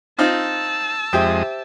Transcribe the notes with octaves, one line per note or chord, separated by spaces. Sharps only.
C4 D#4 F4 A5 E6
F2 G#3 G4 C5 E5 G5 D#6